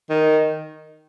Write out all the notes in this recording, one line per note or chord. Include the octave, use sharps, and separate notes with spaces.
D#3